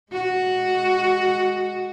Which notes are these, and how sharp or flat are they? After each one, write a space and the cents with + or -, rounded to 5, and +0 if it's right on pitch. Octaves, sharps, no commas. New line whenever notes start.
G#3 +0 F#4 +0